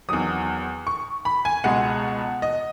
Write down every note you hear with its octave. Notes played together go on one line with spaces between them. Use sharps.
E2 D#3 F#3 D#6
C#6
B5
G#5
C#2 B2 G#3 F#5
D#5